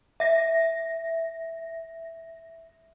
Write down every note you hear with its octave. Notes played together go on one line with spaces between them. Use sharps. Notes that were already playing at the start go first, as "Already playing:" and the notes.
E5 A#6